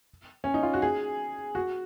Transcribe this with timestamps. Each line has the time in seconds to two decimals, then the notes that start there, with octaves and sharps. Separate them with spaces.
0.44 C#4
0.54 D#4
0.63 F4
0.74 F#4
0.82 G#4
1.55 F#4